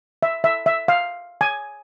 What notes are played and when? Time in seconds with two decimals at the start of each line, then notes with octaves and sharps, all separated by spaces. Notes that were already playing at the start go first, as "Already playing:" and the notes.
0.23 E5
0.44 E5
0.66 E5
0.88 F5
1.41 G#5